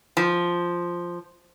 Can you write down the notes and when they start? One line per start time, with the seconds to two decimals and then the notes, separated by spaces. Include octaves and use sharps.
0.17 F3